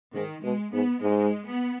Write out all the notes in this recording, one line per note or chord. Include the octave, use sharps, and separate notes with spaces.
G#2 D#3
B2 G#3
G#2 B3
G#2 G#3
B3